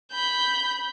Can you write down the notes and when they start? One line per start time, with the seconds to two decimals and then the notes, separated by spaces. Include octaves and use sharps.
0.12 B5 G6